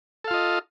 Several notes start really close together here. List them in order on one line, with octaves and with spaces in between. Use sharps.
A4 F5 F4 D#5